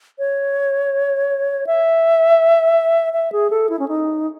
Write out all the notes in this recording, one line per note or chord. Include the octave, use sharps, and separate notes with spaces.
C#5
E5
E5
G#4
A4
E4
C#4
D#4